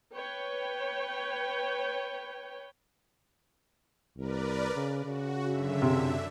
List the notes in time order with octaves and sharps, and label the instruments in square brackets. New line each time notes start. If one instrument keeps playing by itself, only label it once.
[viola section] B4 C#5 G5
[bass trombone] C2 [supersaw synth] A#4 B4 D5
[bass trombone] C#3
[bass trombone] C#3 [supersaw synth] F#4
[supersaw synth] F#2 D3 E5
[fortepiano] C3